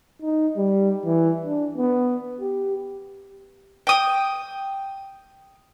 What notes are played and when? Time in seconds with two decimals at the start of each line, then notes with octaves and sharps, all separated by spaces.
0.22 D#4
0.57 G3
1.05 E3
1.46 D4
1.78 B3
2.41 G4
3.87 G5 D#6